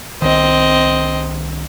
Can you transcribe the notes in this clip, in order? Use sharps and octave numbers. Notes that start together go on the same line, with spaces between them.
C2 D#3 C4 D#5